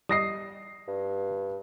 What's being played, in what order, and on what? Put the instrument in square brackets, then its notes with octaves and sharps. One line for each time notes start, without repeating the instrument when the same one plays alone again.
[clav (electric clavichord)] G3 D#5 [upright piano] D#6 A#6 C7
[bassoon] G2